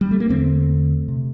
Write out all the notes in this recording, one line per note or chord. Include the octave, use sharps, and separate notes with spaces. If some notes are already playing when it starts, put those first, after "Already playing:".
G3
A3
A#3
E2 D3 A3 C4
C3